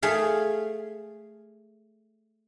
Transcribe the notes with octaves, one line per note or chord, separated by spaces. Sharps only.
A3 G#4 F5